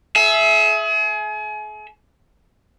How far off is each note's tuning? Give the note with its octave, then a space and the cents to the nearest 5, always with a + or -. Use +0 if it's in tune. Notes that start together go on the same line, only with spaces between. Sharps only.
G#4 +35 E5 +0